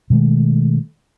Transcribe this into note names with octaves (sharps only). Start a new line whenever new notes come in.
B2 D#3 G#3 A3